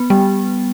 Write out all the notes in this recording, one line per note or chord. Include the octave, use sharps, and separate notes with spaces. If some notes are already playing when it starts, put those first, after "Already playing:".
Already playing: B3
G3